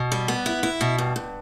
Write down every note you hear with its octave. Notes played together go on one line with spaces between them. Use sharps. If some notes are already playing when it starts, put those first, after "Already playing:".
Already playing: B2
G3
B3
E4
E4
B2
G2
G2